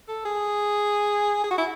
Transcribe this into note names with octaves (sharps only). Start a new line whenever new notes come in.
A4
G#4
G#4
F#4
E4